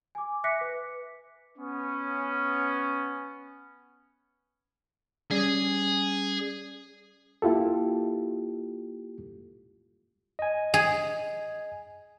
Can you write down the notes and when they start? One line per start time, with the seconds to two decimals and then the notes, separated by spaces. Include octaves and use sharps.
0.15 G#5 D6
0.44 E5 D6 F#6 A#6 B6 C#7
0.61 B4
1.58 B3 C#4
5.31 G3 C#4 G#4 D5
7.42 A#3 E4 F4 G4 A4
10.39 D#5 G#5
10.74 G#4